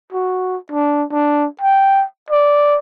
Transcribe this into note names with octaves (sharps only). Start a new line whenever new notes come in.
F#4
D4
D4
G5
D5